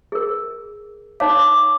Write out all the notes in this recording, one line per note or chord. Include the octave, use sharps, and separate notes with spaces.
G#4 A#4
D#4 C#5 F5 D6